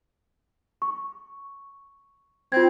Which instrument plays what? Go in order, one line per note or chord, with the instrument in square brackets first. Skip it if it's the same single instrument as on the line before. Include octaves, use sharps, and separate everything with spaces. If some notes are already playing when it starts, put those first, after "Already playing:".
[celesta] C#6
[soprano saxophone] C4 [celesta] F4 G#6